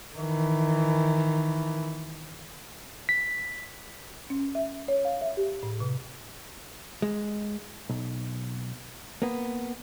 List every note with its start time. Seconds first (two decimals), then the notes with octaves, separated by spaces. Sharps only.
0.16 D#3 E3
3.09 B6
4.30 C#4
4.55 E5
4.88 C#5
5.05 F5
5.21 E5
5.37 G4
5.63 A2
5.80 C3
7.02 G#3
7.89 B1
9.22 A#3 B3